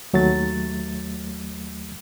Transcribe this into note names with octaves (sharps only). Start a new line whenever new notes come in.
D#2 F#3 A3 A6